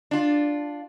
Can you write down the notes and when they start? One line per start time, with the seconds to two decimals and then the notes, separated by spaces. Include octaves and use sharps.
0.11 D4 F4